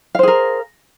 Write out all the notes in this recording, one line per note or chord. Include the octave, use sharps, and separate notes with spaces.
G#4 A#4 C5 F5